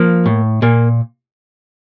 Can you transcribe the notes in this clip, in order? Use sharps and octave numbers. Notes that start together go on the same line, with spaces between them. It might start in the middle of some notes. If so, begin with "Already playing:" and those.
Already playing: F3 A#3
A2
A#2 A#3